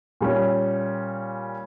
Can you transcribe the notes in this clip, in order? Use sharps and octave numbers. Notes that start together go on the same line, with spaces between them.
A#2 G3 C#4